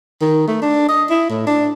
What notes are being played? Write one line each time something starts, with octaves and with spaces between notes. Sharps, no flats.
D#3
A3
D4
D#5
E4
A2
D4